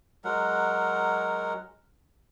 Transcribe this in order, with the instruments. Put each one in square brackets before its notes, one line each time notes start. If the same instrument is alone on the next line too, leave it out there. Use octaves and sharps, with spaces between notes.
[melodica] F#3 G#3 A#4 F#5